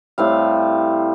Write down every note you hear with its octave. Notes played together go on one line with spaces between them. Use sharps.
A2 G3 C4 F5